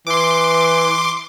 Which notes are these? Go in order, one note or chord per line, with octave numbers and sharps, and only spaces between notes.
E3 C6 D6